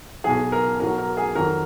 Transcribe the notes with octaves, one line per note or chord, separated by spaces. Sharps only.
B1 B2 F#3 G#4
A#4
B1 B2 F#3 A#4
A#4
G#4
F2 D#3 F#3 A#4